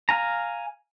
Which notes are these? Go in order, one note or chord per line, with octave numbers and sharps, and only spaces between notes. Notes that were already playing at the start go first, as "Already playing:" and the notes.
F5 G#5 A#5